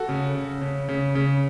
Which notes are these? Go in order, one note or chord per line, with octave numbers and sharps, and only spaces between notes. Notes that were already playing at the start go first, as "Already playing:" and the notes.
Already playing: F#4 A4
C#3
C#3
C#3
C#3
C#3